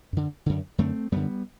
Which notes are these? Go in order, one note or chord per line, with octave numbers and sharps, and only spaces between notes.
F#2 D3
F#2 D3
F#2 D3 A3 C4
F#2 D3 G3 B3